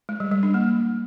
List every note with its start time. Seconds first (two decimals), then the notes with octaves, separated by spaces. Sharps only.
0.09 G#3
0.20 G3
0.32 G3
0.43 D4
0.54 A#3